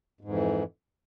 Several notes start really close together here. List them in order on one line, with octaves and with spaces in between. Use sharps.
G#2 F2 E3